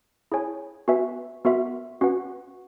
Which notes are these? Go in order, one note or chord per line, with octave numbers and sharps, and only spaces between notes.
E4 G#4 C#5 G#5
B3 F#4 B4 E5 G#5
B3 F#4 A#4 E5
C#4 F#4 B4 F#5